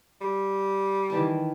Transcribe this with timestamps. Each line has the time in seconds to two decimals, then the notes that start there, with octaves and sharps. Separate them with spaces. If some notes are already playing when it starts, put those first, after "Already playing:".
0.21 G3
1.10 D#3 E3 A5